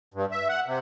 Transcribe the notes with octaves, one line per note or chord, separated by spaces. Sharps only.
G2
E5
F#5
C3